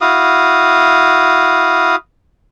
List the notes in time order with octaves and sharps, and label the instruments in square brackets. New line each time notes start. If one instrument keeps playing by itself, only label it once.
[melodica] E4 F#4 F5 D#6